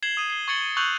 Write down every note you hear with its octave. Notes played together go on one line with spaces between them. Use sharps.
G#6 C7 E7 F#7 G7
D#6 D#7
C7 G7
C#6 G#6 A6 C#7 F#7 G7
C#6 E6 F#6 G6 F7 F#7